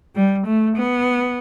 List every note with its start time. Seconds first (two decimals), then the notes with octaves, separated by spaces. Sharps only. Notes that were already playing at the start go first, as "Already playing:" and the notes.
0.15 G3
0.46 A3
0.77 B3